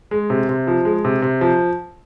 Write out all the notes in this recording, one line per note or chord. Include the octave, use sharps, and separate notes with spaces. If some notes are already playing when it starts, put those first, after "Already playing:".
G#3
C3
C3
F3
G#3
C3
C3
F3